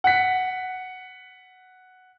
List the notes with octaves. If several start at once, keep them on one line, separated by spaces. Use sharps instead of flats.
F#5 B6